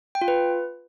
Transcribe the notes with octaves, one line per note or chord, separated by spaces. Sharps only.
G5
F4
B4